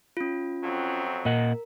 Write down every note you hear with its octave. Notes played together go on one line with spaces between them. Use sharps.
C#4 F4
F2 F#3 C4
A#2 A#4 D#5 F#5